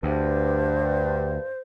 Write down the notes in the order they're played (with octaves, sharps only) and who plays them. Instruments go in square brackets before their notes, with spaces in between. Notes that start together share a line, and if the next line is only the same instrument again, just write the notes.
[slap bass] D2 [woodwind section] G2 [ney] C5